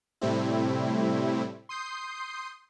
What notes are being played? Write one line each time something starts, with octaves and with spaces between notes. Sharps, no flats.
A2 C3 G3 A3 C4 E4
C6 D#6 G6 C7